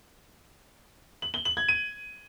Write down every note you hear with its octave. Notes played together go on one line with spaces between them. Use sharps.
F#7
G7
F#7
G#6
D#7